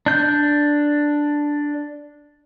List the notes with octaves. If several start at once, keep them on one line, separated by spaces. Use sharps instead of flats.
D4 G6